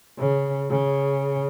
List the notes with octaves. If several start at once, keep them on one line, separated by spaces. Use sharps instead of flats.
C#3
C#3